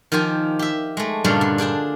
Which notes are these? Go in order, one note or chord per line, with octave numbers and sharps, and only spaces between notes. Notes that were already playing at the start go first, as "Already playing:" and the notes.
D#3 F3 F4 G4 G#5
G4 E5
G#3 A3
G2 A#2 C#3 G3 D4 F4
D3
D4 G#4 G5 A5